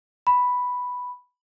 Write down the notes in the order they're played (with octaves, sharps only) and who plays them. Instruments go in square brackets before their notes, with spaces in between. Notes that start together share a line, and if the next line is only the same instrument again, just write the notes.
[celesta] B5